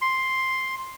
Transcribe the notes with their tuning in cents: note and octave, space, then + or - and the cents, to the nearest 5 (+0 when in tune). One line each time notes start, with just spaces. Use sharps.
C6 +5